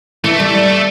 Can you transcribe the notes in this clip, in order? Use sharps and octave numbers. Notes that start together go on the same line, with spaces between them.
E3 A3
G3